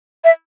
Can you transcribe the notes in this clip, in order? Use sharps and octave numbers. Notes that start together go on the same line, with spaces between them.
E5